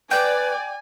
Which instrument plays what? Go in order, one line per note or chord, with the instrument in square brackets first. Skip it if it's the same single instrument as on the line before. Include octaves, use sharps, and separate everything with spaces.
[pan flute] B4 [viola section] D5 [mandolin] G5 [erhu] G#5